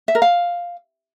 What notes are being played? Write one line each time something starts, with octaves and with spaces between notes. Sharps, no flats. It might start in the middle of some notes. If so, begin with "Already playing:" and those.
E5
A#4
F5